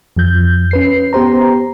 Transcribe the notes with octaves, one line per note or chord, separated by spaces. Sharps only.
F2 F3 G6
C#4 B4 C7
B3 G4 C5 A#5